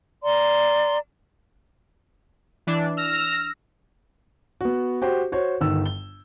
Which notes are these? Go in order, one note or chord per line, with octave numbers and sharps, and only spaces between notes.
D5 A#5 C6
E3 D4
E6 F6 A#6
B3 F#4
F#4 G4 C5
F#4 C5 C#5
G1 D#3 E6
G7